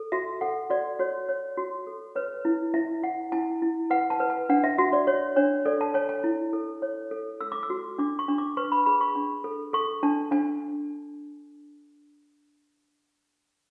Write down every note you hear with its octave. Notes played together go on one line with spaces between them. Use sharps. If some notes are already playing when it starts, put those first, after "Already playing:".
Already playing: A4
F#4 E5
A4 F#5
F#4 D5
F#4 C#5
C#5
F#4
A4
B4 C#5
E4
E4 E5
E4 F#5
E4 G#5
E4
B4 F#5
A5
B4
G#5
D4 F#5
E5
F#4 E5
D5
F#4 C#5
D4 C#5
A4 D5
A5
C#5 G#5
G#5
E4
A4
C#5
A4
A4 E6
D6
E6
F#4
D4 D6
C#6
D4
D6
B4 C#6
B5
G#4 B5
C#6
D4
A4
A4 C#6
D4 A5
D4 G#5